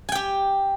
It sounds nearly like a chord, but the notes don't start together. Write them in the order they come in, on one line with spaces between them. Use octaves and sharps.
G#5 G5 G4